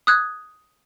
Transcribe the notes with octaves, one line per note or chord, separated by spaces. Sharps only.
D#6 F#6 G#6